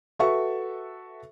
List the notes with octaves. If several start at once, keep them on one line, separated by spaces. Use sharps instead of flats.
F#4 A4 B4 E5 C#6